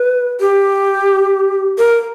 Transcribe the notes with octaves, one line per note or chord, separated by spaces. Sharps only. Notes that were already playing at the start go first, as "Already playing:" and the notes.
Already playing: B4
G4
A#4